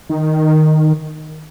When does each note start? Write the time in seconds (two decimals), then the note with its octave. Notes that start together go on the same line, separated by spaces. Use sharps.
0.10 D#3